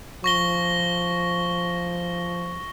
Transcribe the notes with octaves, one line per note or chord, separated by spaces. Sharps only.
F3 C#6 A#6 G7